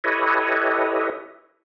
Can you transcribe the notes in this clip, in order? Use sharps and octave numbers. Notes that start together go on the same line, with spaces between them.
E4 G4 A4 B4 C#5 D#5